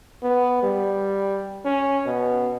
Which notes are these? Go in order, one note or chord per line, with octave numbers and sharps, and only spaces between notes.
B3
G3
C#4
B2